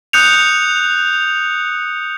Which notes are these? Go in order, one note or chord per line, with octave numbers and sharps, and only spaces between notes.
D#6 F#6 G6 C#7 F7